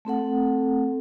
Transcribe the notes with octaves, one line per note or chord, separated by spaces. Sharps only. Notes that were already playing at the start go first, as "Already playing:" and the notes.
A3 C4 A4 F#5